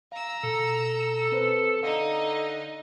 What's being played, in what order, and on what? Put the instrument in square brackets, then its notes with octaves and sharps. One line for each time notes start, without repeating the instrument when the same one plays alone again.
[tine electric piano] F5 [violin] A#5 E6
[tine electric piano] B2 [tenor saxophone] A4
[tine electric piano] C4 B4 C5
[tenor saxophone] D3 [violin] D#4 D#5 [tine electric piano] F5